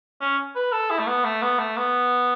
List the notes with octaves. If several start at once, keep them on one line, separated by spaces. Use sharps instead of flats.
C#4
B4
A4
E4
A3
B3
A3
B3
A3
B3